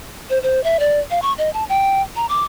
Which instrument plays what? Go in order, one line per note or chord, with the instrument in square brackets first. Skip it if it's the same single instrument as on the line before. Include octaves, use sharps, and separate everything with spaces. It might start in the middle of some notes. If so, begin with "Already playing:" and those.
[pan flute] C5
C5
E5
D5
F5
C#6
D#5
A5
G5
A#5
D6